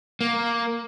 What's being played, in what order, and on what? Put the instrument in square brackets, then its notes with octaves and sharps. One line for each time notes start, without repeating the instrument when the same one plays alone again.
[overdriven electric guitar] A#3